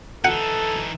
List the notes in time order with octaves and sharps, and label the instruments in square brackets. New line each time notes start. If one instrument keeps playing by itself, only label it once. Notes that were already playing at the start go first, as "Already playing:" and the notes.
[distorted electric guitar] E3 D#4 [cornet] A4 [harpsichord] F#5